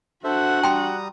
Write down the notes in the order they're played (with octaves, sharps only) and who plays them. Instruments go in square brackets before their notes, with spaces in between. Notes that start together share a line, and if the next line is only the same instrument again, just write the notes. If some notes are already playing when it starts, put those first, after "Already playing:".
[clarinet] D4 [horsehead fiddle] F#4 F#5 [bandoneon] A4 C5 E5
[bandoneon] G3 A#5 D#6 [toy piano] G5 C6